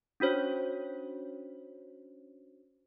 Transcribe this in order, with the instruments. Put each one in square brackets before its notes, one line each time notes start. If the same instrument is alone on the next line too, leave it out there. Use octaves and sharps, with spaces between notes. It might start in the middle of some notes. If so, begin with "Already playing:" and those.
[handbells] C#4 D4 F#4 C5 C#5